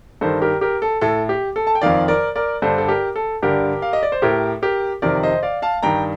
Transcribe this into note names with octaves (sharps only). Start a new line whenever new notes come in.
G2 D#3 A4 C5
G4 A#4
G4 A#4
A4
A2 A4
G4
A4
A5
G5
F2 D#3 D5 F5
A#4 D5
A#4 D5
G2 D3 A4 C5
A4
G4 A#4
A4
G2 D3 G4 A#4
F5
D#5
D5
C5
A2 G4 A#4
G4 A#4
F2 C3 D#3 A#4 D5
C5 D#5
D5 F5
F5 A5
G2 D#3 G5 A#5